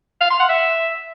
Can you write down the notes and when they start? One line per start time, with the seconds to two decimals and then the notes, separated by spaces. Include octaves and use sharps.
0.21 F5
0.30 C6
0.40 F#5
0.49 E5